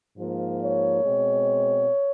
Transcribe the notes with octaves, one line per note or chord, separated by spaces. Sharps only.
G#2 F3 A#3
C#5
B2 G#3 C4